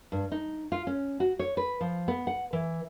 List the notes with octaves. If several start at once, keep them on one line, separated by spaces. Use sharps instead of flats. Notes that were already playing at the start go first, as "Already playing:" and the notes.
G2
D#4
F4
C#4
F#4
C#5
B4
F3
B3
F#5
E3